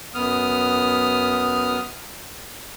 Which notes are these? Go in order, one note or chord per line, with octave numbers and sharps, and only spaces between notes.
F#2 B3 D#6 F6